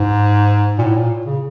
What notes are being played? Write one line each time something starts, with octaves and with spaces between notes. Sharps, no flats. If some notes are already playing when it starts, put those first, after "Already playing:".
Already playing: G#2
A#2
A2
A#2
C#3